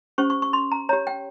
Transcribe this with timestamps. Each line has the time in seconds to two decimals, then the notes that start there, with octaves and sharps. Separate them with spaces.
0.18 C#4 G4 C5 C#6
0.30 C#6
0.42 C#6
0.53 C6
0.72 A#5
0.89 G4 C#5 A#5
1.07 G5